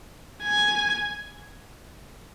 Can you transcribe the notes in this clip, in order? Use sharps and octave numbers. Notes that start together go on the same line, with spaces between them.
G#5